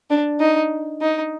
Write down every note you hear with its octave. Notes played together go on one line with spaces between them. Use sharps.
D4
D#4
D#4